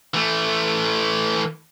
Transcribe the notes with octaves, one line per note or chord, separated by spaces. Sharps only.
E3 A3